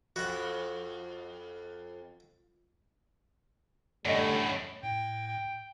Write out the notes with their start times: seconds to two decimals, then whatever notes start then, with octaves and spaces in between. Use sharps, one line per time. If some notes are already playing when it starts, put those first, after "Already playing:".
0.16 F2 F#4 F#5
4.05 F#2 A2 D3 G3 A3 D5 D#5
4.83 A2 G5
5.27 G5